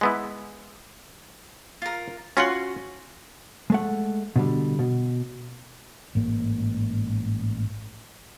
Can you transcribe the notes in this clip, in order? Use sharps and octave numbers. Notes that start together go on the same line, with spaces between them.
G#3 B3 E4
F4 A#4
C#4 F4 F#4 F#5 C6
G#3 A3 F#5
B2 D3 G3
B2
A1 G#2 A#3